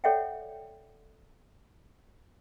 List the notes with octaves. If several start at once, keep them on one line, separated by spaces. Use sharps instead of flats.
A4 C#5 D5 E5 F#5 G5